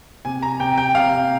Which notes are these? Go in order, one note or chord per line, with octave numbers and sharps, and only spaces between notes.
C3 G#5
A#5
C3 G5
G5
C3 F5